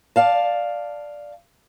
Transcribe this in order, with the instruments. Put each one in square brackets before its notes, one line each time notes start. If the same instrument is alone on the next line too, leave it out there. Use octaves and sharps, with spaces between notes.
[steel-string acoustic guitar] D5 F5 A5